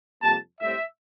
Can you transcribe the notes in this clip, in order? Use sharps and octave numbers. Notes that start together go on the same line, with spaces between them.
F2 C3 G3 A#3 A5
A2 G3 C4 E5